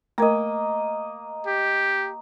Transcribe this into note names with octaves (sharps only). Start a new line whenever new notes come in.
A3 A#3 A#4 D#5
G4